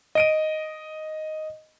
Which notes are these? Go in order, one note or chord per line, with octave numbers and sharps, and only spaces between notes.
D#5 D7 D#7